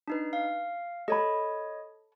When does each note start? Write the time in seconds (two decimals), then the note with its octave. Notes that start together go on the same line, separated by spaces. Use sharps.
0.08 D4 D#4 B4
0.33 F5
1.08 A4 C#5 D#5 B5